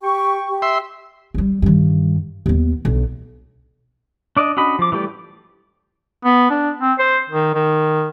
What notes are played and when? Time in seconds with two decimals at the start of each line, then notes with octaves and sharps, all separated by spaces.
0.02 G4 G5 C#6
0.48 G4
0.62 E5 C6
1.34 G3 G#3
1.62 G2 D#3
2.46 D#2 B3
2.85 B1 D4
4.37 D4 D5 D#5
4.57 C#4 D4 F#4 D#5 B5
4.79 F3 D6
4.92 E3 G3 A3 G4 D5
6.25 B3
6.50 D4
6.81 C4
6.99 C5
7.30 D#3
7.54 D#3